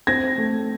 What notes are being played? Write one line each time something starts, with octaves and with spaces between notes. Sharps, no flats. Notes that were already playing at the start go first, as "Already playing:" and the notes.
C4 G#6 A#6
A3